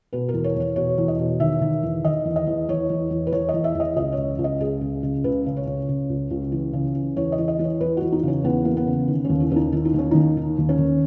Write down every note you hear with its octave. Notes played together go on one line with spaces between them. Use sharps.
B2 B4
A#4
E2
C#5
E2 C#5
B2 C#5
E2
D#5
B2
D#3 E5
D#3
E2
D#3 D#5
E2
D#5
E2
E2 C#5
E2
E2
B4
E2 C#5
D#5
E2
E5
E2
D#5
C#2 D#5
C#5
C#2
C#2
D#5
C#2 G#4
C#3
C#3
C#2 B4
C#3
C#5
C#3
C#3
C#2
C#2
E3
C#3
E3
E2 C#5
D#5
E3
D#5
E3 C#5
E2 B4
E2 F#4
D#4
C#3 C#4
E2 B3
E3 A#3
B3
C#3
D#3
D#2 C#4
E4
D#2 C#4 D#4
D#3 E4
D#4
D#2 C#4
D#2 D#4
D#3
D#2
C#4
D#2